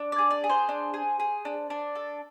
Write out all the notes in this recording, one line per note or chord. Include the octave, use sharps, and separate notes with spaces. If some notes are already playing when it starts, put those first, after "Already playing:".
Already playing: D4
D5
G#4
D5
G#4
C5
D4
G#4
G#4
D4
D4
A4